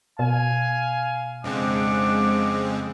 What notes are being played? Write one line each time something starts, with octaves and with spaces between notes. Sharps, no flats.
B2 F5 G#5
F2 C#3 G#3 C4 D4 F#5 D6